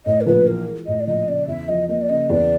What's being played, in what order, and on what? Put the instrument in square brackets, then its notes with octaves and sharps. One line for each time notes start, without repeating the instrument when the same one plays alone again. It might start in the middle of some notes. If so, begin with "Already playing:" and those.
[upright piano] A2 [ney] D#5
[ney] A#4
[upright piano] A#1 [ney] B4
[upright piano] E3 [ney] A#4
[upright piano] G#3
[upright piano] A2 [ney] D#5
[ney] D5
[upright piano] A#1 [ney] D#5
[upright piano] C#3 [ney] D5
[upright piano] E2 [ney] E5
[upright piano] F3 [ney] D#5
[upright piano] A#3 [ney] D#5
[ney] D5
[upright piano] C#3 [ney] D#5
[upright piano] E2 [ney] D5